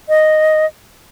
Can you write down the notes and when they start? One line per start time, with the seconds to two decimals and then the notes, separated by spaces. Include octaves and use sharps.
0.09 D#5